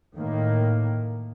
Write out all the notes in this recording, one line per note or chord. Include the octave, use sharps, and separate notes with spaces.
A2 D#3 A#3